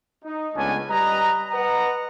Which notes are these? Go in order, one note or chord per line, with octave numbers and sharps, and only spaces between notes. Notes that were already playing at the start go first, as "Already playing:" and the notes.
D#4
C#2 A3 B3 C#4 D4 G#5
G3 B4 D#5 A#5
B4 D#5 F#5 A#5